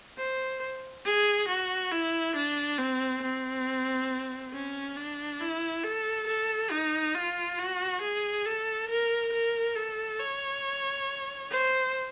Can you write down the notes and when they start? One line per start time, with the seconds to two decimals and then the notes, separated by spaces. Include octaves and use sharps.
0.18 C5
1.05 G#4
1.48 F#4
1.92 E4
2.36 D4
2.78 C4
3.22 C4
4.53 C#4
4.97 D4
5.40 E4
5.84 A4
6.27 A4
6.71 D#4
7.15 F4
7.59 F#4
8.01 G#4
8.46 A4
8.88 A#4
9.33 A#4
9.76 A4
10.20 C#5
11.51 C5